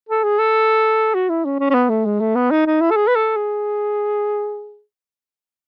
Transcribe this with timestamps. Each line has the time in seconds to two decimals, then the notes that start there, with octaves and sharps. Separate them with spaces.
0.09 A4
0.24 G#4
0.39 A4
1.14 F#4
1.30 E4
1.45 C#4
1.60 C#4
1.70 C#4
1.74 B3
1.89 A3
2.05 G#3
2.20 A3
2.36 B3
2.51 D#4
2.66 D#4
2.81 E4
2.91 A4
2.96 G#4
3.08 B4
3.16 A4
3.36 G#4